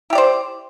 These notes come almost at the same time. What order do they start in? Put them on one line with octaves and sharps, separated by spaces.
E4 G4 D5 C5